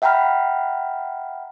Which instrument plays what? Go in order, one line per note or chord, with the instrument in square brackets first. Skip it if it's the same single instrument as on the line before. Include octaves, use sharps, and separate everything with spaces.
[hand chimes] E5 F#5 G5 A#5 B5 F6